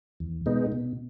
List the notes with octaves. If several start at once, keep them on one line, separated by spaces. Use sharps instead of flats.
E2
B2 G#3 B3 D#4
B2